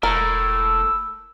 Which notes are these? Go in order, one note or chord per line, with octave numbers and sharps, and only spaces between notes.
E1 A2 A#4 E6